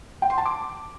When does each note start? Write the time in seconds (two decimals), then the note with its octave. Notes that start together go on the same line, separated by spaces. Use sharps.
0.22 G5
0.30 C6
0.38 A5
0.46 D6